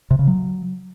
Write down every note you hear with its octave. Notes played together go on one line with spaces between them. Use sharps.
C3
C#3
F#3